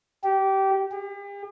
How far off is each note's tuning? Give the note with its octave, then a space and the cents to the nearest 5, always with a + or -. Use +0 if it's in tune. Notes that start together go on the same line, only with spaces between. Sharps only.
G4 -20
G4 +45